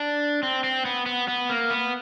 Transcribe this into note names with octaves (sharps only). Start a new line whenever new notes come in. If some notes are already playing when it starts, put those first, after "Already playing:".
Already playing: D4
C4
C4
B3
B3
B3
A#3
B3